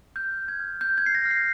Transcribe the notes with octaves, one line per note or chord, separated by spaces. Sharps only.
F6 G6
F6
G#6
F6
F6 G6
G#6
F6 C7
A#6
F6
C7